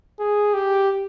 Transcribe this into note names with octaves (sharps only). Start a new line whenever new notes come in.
G#4
G4